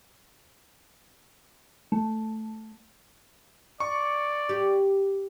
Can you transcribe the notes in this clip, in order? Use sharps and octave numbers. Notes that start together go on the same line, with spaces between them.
A3
D5 C#6
G4